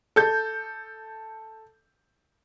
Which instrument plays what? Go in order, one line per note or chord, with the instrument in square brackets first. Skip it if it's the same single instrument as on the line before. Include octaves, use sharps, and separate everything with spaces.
[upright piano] A4 G6